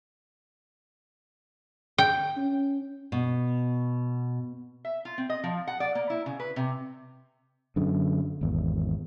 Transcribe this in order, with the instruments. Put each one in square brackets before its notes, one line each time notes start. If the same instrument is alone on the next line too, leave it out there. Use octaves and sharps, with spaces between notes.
[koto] G5
[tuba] C#4
[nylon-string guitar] B2
[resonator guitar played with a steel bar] E5
F4
C4
D#5
F3
F#5
D5
A#3
E4
C#3
B4
C3
[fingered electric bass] F#2 D3
G#1 E2